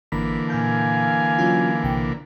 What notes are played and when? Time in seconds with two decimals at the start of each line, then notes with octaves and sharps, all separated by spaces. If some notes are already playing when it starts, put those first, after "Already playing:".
0.12 G#1 D3 E3 A#3 B5 B6
0.50 A#2 F5 G#5 F6 G6
1.38 F#3 C#4 F4
1.84 B1 C3 G5